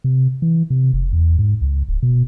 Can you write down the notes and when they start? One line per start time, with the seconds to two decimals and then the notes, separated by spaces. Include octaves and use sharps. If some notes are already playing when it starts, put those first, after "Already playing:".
0.04 C3
0.42 E3
0.70 C3
0.93 F1
1.12 E2
1.39 G#2
1.62 C#2
1.88 D1
2.03 B2